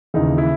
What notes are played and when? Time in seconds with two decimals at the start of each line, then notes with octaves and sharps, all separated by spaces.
0.14 D#2 C#3 E3 D#4
0.38 E4